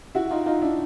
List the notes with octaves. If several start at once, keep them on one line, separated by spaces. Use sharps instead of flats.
E4 F#4
D#4 F4
D#4 F4
D4 E4